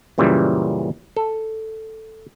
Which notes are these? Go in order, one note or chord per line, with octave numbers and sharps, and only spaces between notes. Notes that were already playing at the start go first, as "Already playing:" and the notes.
F#2 A#2 C#3 E3 G3
A4